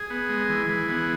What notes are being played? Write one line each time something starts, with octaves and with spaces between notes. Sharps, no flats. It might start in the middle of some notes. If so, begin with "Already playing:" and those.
Already playing: G#4
B3
G#3
E3
E3
B3